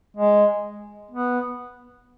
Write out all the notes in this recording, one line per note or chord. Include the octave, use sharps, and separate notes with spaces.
G#3
B3